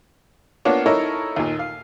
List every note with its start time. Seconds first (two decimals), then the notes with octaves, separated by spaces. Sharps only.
0.65 A#3 B3 D4 F4 C#5
0.86 D#4 E4 A4 A#4 C#5
1.36 D#2 A#2
1.59 F5